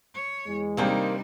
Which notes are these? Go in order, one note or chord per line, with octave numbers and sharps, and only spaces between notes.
C#5
E2 G#3
C3 D#3 G3 A#3 D4 D#4 C5 G5